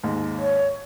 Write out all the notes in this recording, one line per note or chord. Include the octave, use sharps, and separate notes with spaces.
D#2 G#2 G#3
C#5